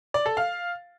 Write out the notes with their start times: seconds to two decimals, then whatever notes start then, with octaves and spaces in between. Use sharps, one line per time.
0.14 D5
0.26 A4
0.37 F5